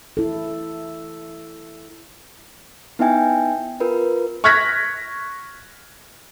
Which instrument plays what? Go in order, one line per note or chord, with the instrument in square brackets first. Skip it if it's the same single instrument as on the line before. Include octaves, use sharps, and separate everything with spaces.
[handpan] E4 A4
[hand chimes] B3 D#4 E4 E5 G5 G#5
F4 A#4 B4
[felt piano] C#6 F6 F#6 G#6 A#6 B6